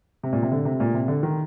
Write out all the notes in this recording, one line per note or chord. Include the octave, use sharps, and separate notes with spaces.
C3
A#2
C3
D3
C3
A#2
C3
D3
D#3